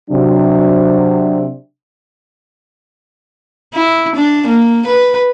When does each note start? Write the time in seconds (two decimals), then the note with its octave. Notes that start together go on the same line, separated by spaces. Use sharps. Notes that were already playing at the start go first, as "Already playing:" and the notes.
0.11 C3 F#3 D4
3.74 E4
4.16 D4
4.47 A#3
4.87 B4